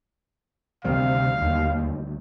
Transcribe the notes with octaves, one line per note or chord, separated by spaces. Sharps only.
D2 C3 D#3 G3 F5
D#2